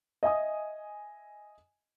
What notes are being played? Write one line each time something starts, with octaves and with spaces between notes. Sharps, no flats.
D#5 E5 G#5 D#6